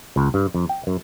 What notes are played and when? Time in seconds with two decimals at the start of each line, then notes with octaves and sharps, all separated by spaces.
0.16 C#2
0.34 G2
0.55 F2
0.69 G5
0.87 F#2